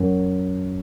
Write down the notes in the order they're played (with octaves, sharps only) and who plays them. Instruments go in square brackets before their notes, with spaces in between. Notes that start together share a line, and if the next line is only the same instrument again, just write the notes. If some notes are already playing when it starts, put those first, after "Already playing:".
Already playing: [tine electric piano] F#2